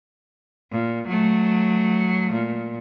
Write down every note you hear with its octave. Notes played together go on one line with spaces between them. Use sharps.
A#2
F#3 A3
A#2